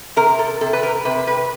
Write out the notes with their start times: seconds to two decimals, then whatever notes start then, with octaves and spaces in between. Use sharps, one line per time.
0.16 C3 A#4
0.39 A4
0.61 C3 A4
0.73 B4
0.83 A#4
1.05 C3 B4
1.27 B4